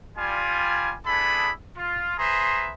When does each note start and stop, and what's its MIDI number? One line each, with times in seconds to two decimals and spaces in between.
0.18 0.95 55
0.18 0.95 65
0.18 0.95 80
1.06 1.51 59
1.06 1.51 62
1.06 1.51 64
1.06 1.51 68
1.06 1.51 69
1.06 1.51 83
1.76 2.15 65
2.18 2.72 68
2.18 2.72 71
2.18 2.72 72
2.18 2.72 76
2.18 2.72 82
2.18 2.72 84